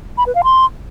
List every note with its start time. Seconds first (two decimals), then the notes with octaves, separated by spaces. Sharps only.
0.18 B5
0.26 B4
0.35 F5
0.44 C6